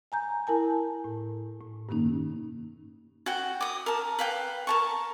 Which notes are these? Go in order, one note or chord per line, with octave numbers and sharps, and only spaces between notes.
G#5 A#5 G6
E4 A#4 G#5 A5
A2
A2
G2 C3 D#3 A#3 C#4 D#4
F#4 G5
D6 D#6
A#4 A5
B4 F5 G5
A#4 A5 C#6